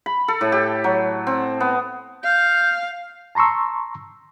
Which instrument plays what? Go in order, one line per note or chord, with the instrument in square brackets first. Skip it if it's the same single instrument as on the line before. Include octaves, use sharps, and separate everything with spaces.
[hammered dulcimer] B5
A4
A2
G4
F#3
C4
B3
[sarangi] F5 [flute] G6
[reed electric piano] A5 A#5 C6 C#6 E6